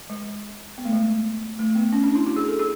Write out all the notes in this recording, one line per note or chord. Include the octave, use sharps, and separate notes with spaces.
G#3
B3
A3
G#3
A3
B3
C#4
D4
E4
F#4
G#4
A4
G#4